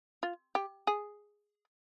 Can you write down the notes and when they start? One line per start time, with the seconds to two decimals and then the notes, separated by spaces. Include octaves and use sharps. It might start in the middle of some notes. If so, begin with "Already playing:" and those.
0.23 F4
0.55 G4
0.87 G#4